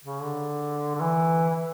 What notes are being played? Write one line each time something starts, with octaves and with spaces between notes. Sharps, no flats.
C#3
D3
D3
E3